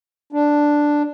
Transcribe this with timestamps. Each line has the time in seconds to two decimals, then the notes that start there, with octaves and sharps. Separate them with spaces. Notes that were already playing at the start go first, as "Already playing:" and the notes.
0.33 D4